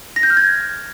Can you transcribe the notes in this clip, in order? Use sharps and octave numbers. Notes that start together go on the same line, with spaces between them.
A#6
G6
F6
G#6